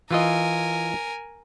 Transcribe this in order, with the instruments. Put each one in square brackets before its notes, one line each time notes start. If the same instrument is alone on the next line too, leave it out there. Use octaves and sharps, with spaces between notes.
[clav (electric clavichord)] E3 F4 D#5 [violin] A#4 G#5